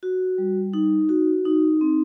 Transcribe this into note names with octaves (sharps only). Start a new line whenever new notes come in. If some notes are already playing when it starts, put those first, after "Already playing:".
F#4
G3
D#4
F#4
D#4
C4